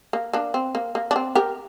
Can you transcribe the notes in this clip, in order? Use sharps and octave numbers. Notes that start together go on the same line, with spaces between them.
A#3
A#3 D4
C4
A#3
A#3
D4
C4
G4 A#4